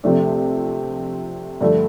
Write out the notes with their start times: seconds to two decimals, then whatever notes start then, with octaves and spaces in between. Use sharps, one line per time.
0.03 C3 F3 A3 D4
1.61 G2 D3 F3 A3